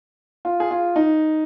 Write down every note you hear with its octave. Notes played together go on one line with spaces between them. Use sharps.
F4
G#4
F4
D#4